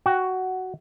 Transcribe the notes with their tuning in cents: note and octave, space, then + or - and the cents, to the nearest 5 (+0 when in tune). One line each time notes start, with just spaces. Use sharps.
F#4 +10 G5 +0